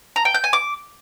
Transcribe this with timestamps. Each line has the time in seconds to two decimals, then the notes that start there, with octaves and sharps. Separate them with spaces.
0.16 A#5
0.25 G5
0.34 G6
0.44 G#5
0.53 D6